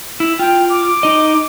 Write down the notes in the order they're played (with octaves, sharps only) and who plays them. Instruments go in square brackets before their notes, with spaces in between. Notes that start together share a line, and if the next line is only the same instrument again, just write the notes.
[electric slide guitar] E4
[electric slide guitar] F4 [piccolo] G5
[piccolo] D6
[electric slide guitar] D#4 D#5